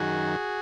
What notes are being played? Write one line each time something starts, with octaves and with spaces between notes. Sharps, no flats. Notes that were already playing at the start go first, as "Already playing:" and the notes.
Already playing: F#2 D#3 F#4 G#4